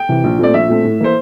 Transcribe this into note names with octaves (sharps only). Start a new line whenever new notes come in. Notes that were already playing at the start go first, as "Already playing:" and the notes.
Already playing: G5
C3 E3
A#1
A#2 A3 C4 D5
A#1 E5
A#2 A3 C4
A2
E3 A#3 C5